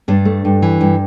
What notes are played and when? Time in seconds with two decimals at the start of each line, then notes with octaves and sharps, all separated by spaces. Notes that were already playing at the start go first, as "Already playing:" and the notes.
0.08 G2 D4
0.25 A3
0.45 G2
0.62 E3
0.81 G2